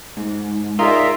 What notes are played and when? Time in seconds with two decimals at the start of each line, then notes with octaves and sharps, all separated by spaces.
0.17 G#2
0.79 D#4 F4 G#4 A#4 D5 E5